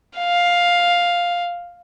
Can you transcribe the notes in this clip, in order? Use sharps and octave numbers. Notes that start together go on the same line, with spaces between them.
F5